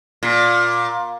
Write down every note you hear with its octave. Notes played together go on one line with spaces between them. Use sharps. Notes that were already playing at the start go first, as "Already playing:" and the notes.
A#2